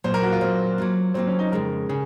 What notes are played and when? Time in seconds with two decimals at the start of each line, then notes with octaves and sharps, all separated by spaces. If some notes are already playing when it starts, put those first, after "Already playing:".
0.04 A#2 F#3 A#3 C5
0.14 A#4
0.22 F#4
0.32 F4
0.41 A#2 F#3 A#3 C4
0.78 F#3 A#3 F4
1.14 F#3 A#3 C4 F4
1.27 C#4
1.39 D#4
1.52 F2 C#3 G#3 C#4 A#4
1.89 C#3 G#4